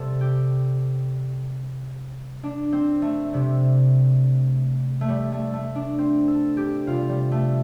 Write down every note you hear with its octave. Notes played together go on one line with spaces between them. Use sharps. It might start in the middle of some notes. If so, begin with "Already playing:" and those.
Already playing: C3 G3 A4
G4
D4
C4
A3
C3 G3
A3
G3
A3
A3
D4
C4
A4
G4
C3 G3 F4
G3
A3